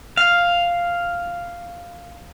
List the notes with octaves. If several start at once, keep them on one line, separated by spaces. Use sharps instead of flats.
F5